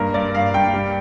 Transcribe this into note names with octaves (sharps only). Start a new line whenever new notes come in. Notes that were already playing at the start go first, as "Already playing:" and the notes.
Already playing: G2 A#3 A#4
G2 D5
G2 F5
G2 G5
G3